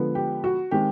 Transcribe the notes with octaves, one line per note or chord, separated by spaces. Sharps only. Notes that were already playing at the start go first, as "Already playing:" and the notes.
Already playing: D3 F3 G#3 B3
G4
F#4
D#3 G#3 C4 G4